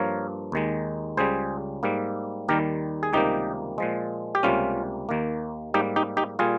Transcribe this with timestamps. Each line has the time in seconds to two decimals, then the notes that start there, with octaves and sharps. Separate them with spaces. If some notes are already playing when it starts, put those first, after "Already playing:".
Already playing: G2 F3 A#3 A#4 C#5
0.52 D#2 D#3 G#3
1.17 C#2 C#3 G3 G#4 C5
1.83 G#2 G3 A#3
2.48 D#2 D#3 G3 G4 A#4
3.03 G#4
3.13 C#2 C3 D#3 G3 A#3 D#4 G4
3.78 A#2 F3 G#3
4.35 G4
4.43 C#2 C3 G3 A#3 C#4 F4
5.09 D#2 D#3 A#3
5.74 G#2 G3 A#3 D#4 G4
5.96 D#4 G4
6.17 D#4 G4
6.39 A#2 G3 F4 G#4